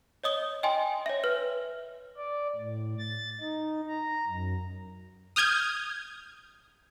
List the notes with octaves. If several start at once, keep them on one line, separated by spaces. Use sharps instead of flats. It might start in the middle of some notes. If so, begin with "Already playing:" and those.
C#5 D#5 D#6 G7
D#5 G5 G#5 C6
C#5 E5
B4 F6
D5
A2
A6
D#4
A#5
F#2
D#6 F6 G6 G#6